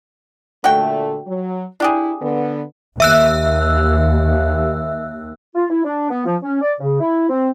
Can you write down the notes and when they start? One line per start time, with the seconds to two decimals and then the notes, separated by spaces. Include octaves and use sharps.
0.64 A#2 D3 A3 F#4 G5
1.27 F#3
1.80 D4 E4 G4 G#4
2.21 D3 B3
3.00 D#2 E5 E6 F#6
5.55 F4
5.70 E4
5.85 D4
6.11 B3
6.25 F3
6.43 C#4
6.61 D5
6.80 C#3
7.01 E4
7.29 C4